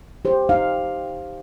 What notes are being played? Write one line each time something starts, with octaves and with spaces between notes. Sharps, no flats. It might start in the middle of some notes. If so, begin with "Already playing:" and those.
G4 C5
D#4 F5